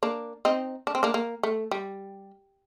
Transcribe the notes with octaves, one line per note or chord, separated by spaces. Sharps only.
A#3 D4
C4 D#4
D4
C4
A#3 D4
A#3
A3
G3